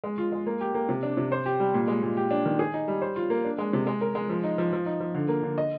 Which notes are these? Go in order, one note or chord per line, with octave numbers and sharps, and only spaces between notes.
G#3
F4
G#3
A#3
G4
A#3
C3
D4
C3
C5
G4
G3
A#2
G#3
A#2
G4
D4
D#3
G#4
D#4
G3
C5
F4
A#3
D4
G#3
C3
G#3
A#4
G#3
F3
D#4
F3
F3
D#4
F3
D3
A#3
D3
D#5